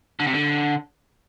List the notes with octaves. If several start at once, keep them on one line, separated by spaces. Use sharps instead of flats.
D3
C3
D3